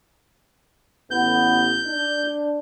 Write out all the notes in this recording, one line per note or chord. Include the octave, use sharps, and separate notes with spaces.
A1 B3 G6
D4